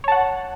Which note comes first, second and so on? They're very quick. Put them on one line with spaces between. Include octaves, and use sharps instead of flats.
C#5 A5 F#5